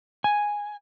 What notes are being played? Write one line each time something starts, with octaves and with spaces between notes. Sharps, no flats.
G#5